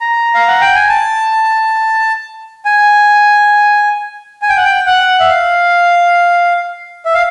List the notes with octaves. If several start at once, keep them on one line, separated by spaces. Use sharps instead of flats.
A#5
F5
F#5
G5
G#5
A5
G#5
G#5
G5
F#5
G5
F#5
E5
F5
E5
F5